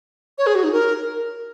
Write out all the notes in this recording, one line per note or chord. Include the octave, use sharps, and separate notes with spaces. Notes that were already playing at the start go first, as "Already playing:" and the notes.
C#5
G#4
F#4
D#4
A#4